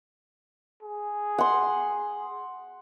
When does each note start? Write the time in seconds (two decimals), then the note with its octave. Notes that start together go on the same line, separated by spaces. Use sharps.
0.82 G#4
1.38 F#5 C6